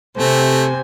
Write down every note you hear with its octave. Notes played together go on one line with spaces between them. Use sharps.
C3 A3 C5 G#5